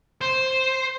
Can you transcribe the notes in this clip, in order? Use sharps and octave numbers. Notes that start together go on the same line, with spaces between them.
C5